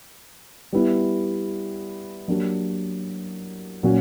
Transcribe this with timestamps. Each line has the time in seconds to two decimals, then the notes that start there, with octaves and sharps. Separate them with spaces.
0.73 G3 B3 E4
2.28 F#3 A#3 D4 G4
3.83 A#2 F#3 C#4 F#4